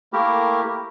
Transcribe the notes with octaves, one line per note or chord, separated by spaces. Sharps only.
A3 A#3 E4 G4 A#4